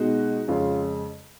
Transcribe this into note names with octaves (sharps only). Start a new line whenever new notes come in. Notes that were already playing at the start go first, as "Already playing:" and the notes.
Already playing: B2 G#3 D#4 F#4
F2 C#3 G#3 C#4 F4